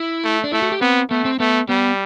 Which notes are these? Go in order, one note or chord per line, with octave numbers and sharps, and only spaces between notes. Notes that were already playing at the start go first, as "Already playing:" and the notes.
Already playing: E4
A3
D4
A3 E4
F#4
G4
B3 C4
A3 B3
C4
A3 B3
G3 B3